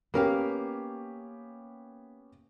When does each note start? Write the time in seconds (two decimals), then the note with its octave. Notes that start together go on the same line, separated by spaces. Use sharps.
0.14 A#3 B3 C#4 G4 A#4 F5